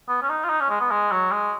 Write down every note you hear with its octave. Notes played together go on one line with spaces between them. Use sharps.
B3
C#4
D#4
F4
D#4
C#4
G#3
B3
G#3
F#3
G#3